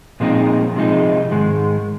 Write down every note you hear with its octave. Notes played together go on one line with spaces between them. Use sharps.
A#2 F3 G#3 C4 D#4
C3 F3 G#3 D#4
G#2 D#3 G#3